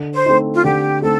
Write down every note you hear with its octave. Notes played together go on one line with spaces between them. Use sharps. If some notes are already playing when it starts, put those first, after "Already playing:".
Already playing: D3
C5
A3 C4 D#4
F4
D3 G4
A3 C4 D#4 A4